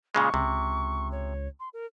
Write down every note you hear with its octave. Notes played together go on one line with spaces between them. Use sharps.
A#2 C#3 G#3 C#6
C#2 C3
C#5
C6
A#4